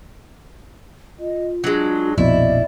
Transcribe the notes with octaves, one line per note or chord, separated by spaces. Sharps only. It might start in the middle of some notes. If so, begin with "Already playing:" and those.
F4 D#5
F#3 G#3 D4
A#1 F2 B2 E4 D5 D#5